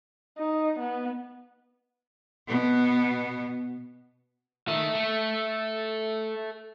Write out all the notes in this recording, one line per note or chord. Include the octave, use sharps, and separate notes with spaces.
D#4
B3
B2 B3
D#3 A4 E5
A3